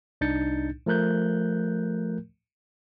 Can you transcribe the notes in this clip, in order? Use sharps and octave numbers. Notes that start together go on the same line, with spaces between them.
C2 D4 D#4 G6 A6 C#7
F3 A3 A#4 F#6 G6